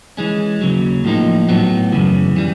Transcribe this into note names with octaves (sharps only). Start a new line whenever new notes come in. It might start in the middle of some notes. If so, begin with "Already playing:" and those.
E3 G#3 C#4
D#2 C#3 F#3
A2 F3 A#3 D#4
A2 F#3 B3
F#2 C#3 E3
E3 G3